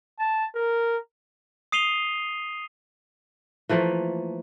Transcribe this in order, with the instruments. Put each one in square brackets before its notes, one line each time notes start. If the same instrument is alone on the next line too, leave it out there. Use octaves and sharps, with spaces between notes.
[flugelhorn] A5
A#4
[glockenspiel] D#6 C7 D#7 F7 G7
[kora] E3 F3 A3 A#3